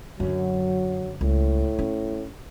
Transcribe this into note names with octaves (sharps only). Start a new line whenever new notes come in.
F#2 D3 F#3
C#2 A2
C#4